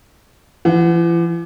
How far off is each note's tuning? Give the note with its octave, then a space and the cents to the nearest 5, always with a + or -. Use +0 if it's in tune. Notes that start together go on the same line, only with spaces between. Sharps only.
E3 +45 F#5 +0